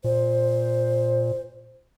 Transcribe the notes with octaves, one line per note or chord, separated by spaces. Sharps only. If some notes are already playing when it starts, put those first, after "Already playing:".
A#2 C5